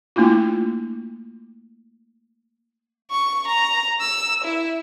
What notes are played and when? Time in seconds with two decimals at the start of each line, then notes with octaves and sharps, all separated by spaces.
0.16 A3 A#3 D4 E4 F4
3.11 C#6
3.47 A#5
4.00 E6
4.44 E4